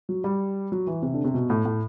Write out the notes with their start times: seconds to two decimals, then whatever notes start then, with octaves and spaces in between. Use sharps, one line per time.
0.09 F#3
0.24 G3
0.72 F#3
0.87 E3
1.02 C3
1.14 D3
1.24 C3
1.34 B2
1.50 A2
1.65 A2